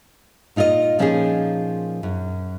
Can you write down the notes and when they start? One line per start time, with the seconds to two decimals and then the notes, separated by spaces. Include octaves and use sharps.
0.56 A#2 D#4 F4 A#4 D#5
0.99 A#2 F3 C#4 D#4 F4 G#4
2.03 F#2